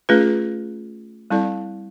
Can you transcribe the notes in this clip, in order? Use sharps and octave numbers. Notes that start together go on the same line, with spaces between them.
A3 C#4 F4 G#4 B4
G3 C4 E4 A4 D5